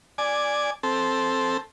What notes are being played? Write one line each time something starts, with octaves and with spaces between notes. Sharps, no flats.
D5 G#5
C4 A4